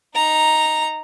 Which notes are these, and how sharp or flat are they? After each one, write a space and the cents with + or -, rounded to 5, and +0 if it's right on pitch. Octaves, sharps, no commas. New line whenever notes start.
D#4 +0 A#5 +0